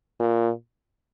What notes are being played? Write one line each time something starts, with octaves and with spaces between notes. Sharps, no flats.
A#2